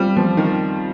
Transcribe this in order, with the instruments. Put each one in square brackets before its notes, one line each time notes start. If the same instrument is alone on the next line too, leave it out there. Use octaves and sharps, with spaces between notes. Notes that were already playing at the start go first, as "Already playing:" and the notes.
Already playing: [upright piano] G3 [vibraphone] C4 F4 C5 F5
[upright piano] F3
D#3